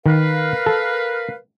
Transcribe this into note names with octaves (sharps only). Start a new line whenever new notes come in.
D#3 A#4 B4 F5
A4